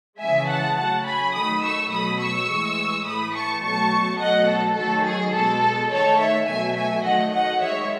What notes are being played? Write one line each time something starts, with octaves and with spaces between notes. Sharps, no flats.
C#3 E3 G#3 E5 G#5
F#5 A5
C#3 F#3 A3 F#5 A5
G#5 B5
D#3 F#3 A3 B5 D#6
C#6 E6
B2 F#3 A3 B5 D#6
C#6 E6
A2 E3 G#3
A2 E3 A3 B5 D#6
A5 C#6
B2 F#3 A3 A5 C#6
B2 F#3 A3 D#5 F#5
A4
D#3 F#3 A3 A4
G#4
B2 G#3 A4
D#3 A3 A4 C#5
C#5 E5
B2 F#3 A3 E5 G#5
E5 G#5
D#3 F#3 A3 D#5 F#5
D#5 F#5
D#3 G#3 C#5 E5